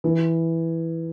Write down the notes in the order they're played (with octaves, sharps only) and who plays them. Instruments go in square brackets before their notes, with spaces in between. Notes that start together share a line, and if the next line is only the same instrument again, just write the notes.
[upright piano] E3